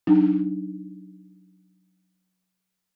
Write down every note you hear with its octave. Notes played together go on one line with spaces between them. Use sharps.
F#3 D4 D#4